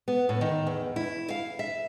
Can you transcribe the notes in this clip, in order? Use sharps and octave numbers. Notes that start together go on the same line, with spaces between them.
B3
A2
D#3
E2
E4
F5
E5